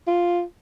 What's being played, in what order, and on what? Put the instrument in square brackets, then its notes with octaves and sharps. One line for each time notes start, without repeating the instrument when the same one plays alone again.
[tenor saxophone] F4